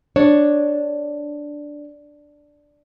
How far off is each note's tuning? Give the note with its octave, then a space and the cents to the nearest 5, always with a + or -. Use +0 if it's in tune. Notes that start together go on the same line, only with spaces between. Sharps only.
D4 +0 C#5 +0